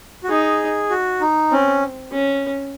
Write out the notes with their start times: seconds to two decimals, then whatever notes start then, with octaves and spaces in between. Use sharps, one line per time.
0.24 F#4
0.29 D#4 G#4
0.90 F#4
1.21 D#4
1.51 C4 C#4
2.12 C#4